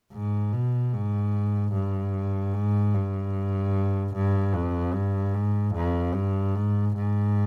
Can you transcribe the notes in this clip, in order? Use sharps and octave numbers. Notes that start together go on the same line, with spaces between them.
G#2
B2
G#2
G2
G#2
G2
G2
F2
G2
G#2
F2
G2
G#2
G#2